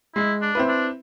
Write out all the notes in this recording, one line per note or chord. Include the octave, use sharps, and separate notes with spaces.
G#3 E4
D4
C4 E4 B4
D4